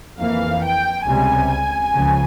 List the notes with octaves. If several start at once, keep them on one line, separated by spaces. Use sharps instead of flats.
F2 E3 A#3 F5
G5
C#2 C3 G3 G#5
C#2 C#3 F3